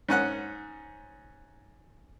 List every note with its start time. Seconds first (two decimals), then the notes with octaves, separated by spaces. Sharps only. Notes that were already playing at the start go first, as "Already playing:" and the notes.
0.09 G#2 C#4 F#5 F#6